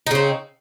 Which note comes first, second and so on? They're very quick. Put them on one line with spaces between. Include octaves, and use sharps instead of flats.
D#4 C#3 C4